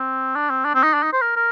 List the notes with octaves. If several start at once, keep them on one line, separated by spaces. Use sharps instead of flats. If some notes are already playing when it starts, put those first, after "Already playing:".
Already playing: C4
D4
C4
D4
C4
D#4
D4
D#4
C5
A#4
A#4